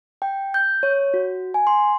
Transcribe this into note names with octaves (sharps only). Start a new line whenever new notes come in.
G5
G6
C#5
F#4
G#5
C6